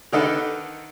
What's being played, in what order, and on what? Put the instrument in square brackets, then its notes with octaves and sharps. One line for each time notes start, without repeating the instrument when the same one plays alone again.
[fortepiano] D3 D#3 D#4 A4 B4